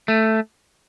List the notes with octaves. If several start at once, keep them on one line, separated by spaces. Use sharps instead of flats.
A3